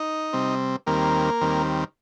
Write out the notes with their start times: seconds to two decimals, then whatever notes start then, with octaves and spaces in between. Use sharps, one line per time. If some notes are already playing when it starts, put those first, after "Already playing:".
Already playing: D#4 D#5
0.33 C3 G3 C4
0.87 D#2 D#3 G3 A#3 C4 A#4
1.41 D#2 D#3 G3 C4